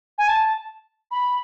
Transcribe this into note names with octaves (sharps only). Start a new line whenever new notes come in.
G#5
A5
B5